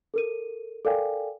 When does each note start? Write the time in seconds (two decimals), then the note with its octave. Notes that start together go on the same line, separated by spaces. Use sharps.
0.14 A4 A#4 D#7
0.85 A4 A#4 D5 F5 G5 G#5